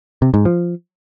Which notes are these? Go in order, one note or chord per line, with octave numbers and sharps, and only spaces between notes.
C3
G#2
F3